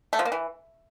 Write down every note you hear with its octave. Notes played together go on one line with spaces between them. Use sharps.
A3
F3
A#3
E3